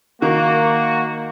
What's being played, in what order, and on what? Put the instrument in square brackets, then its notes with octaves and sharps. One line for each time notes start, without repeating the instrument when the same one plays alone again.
[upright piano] D#3 [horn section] A#3 F#4